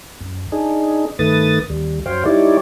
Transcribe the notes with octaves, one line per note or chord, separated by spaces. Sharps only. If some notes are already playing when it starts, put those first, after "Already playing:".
F#2
D4 D#4 G#4
G2 D#3 A3 B4 D#6 A6
D#2 G3
F#2 F#3 C5 C#5 F5 G5
G3 D#4 E4 G4 C#5 D5